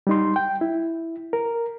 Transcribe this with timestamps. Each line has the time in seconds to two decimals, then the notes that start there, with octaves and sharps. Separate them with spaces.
0.07 G3 D#4 C6
0.36 G5
0.61 E4
1.33 A#4